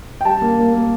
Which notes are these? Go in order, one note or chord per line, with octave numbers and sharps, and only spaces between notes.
G5
G3 A5
A#3
A#3
A#3